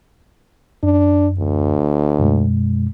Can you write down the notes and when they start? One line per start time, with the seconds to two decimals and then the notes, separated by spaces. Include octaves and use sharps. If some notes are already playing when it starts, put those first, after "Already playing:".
0.83 F#2 D4
1.38 D2
2.19 F#2 B2 G#3